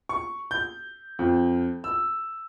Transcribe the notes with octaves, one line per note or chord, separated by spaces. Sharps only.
C#6
G6
F2
E6